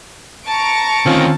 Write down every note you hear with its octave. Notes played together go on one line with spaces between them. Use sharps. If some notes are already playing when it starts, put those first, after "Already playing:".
A5 A#5 C#6 D7
D2 D#3 C4 C#4 F4